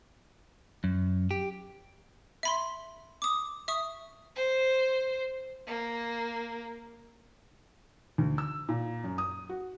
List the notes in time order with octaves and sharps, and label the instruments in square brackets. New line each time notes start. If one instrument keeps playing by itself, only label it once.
[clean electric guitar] F#2
G4
[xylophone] E5 B5 C6
D6 D#6
E5 C#6 D#6
[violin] C5
A#3
[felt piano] D2
E6
A#2
F#2
D#6
F#4